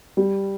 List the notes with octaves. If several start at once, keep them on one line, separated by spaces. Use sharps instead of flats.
G3